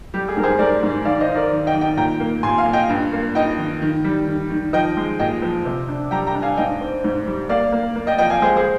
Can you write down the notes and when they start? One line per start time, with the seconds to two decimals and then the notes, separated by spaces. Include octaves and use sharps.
0.14 G3 G4
0.28 G#4
0.37 G#2 A#4
0.43 G#4 C5
0.59 G#2 A#4 D5
0.83 G#2
1.05 D#3 D5 F5
1.20 C5 D#5
1.28 D#4
1.35 A#4 D5
1.52 D#3
1.67 D#5 G5
1.74 D#3
1.81 D#5 G5
1.97 A#2 G5 A#5
2.20 A#3
2.43 A#2 G#5 C6
2.58 F5 G#5
2.66 A#2
2.73 D#5 G5
2.90 G2
3.13 A#3
3.35 D#4 D#5 G5
3.59 D#3
3.82 D#3
4.04 G3
4.28 D#3
4.50 D#3
4.73 F3 D#5 G5
4.97 G#3
5.20 A#2 D#5 G5
5.42 F3
5.65 C3
5.89 D4
6.11 G3 G5 A#5
6.27 G5 A#5
6.35 D4
6.42 F5 G#5
6.57 G#2 D#5 G5
6.81 C4
7.04 G#2
7.27 G3
7.49 A#3 D5 F5
7.72 A#3
7.95 A#3
8.07 D#5 G5
8.18 F3 D#5 G5
8.30 F5 G#5
8.42 G#3 G#4 C5
8.57 G#4 C5